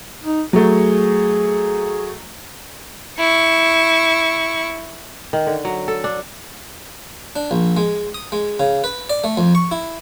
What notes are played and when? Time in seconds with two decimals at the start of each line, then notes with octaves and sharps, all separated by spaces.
0.23 D#4
0.53 F#3 A3 G#4
3.19 E4 C#6
5.33 D#3
5.47 D3
5.65 F#3
5.88 A4
6.04 D4
7.36 D4
7.51 A#1
7.77 G#3
8.15 D#6
8.32 G#3
8.60 C#3
8.84 B4
9.10 D5
9.24 A3
9.37 F2
9.55 C#6
9.71 E4